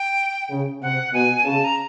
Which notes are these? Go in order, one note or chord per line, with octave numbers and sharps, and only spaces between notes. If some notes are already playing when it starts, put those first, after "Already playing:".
Already playing: G5
C#3
C3 F#5
B2 G#5
C#3 A5
A#5